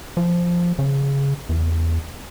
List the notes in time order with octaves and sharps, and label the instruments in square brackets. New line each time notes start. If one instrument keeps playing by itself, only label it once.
[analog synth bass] F3
C#3
E2